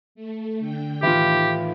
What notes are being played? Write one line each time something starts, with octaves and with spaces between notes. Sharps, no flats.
A3
D3 G5
A2 D#3 E3 F4 G4